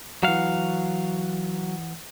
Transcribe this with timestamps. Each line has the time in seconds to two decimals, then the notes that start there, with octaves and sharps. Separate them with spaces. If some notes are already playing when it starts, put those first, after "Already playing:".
0.23 E3 F#3 F5 F#5